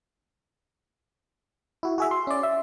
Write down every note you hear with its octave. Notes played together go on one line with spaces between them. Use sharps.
E4 F#4
F#4 G#4 E5
C6
C#4 D5
E5